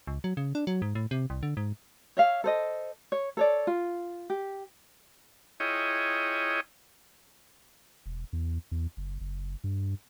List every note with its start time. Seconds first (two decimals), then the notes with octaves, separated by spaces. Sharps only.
0.07 C#2
0.24 F#3
0.37 C#3
0.55 D4
0.67 F#3
0.82 G#2
0.95 A2
1.11 C3
1.30 C2
1.43 D3
1.57 G#2
2.17 C#5 E5 F5
2.44 A4 C5 D#5
3.12 C#5
3.37 A4 C#5 D5
3.67 F4
4.30 G4
5.60 E4 F4 G#4 C#5 D#5 G5
8.06 E1
8.33 E2
8.71 E2
8.97 F#1
9.20 F#1
9.64 G2